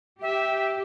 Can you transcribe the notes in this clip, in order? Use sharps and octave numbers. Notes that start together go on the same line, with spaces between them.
G4 E5